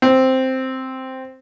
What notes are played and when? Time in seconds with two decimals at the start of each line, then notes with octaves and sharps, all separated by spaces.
0.02 C4